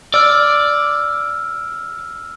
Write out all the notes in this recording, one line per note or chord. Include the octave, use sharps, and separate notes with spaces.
D5 E6 F6